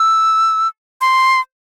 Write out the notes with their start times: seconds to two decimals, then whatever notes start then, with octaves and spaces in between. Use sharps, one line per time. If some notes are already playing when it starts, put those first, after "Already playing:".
Already playing: E6
1.01 C6